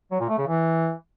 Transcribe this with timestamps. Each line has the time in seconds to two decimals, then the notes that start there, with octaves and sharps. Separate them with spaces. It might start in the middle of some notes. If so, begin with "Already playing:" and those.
0.11 F#3
0.20 A#2
0.29 A3
0.38 C#3
0.47 E3